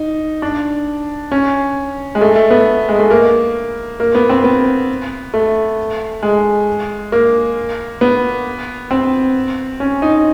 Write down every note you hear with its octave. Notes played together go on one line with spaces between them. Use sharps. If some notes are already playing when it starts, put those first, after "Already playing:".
Already playing: D#4
D4
C#4
G#3
A3
A3
B3
G#3
A3
A#3
A#3
B3
C4
B3
A3
G#3
A#3
B3
C4
C#4
D#4